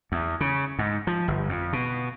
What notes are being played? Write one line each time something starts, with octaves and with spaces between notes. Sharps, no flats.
E2
C#3
G#2
F3
G1
F2
B2